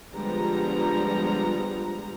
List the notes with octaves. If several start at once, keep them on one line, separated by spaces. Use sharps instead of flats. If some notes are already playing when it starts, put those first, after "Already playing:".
D3 F3 G3 G#3 B3 A#5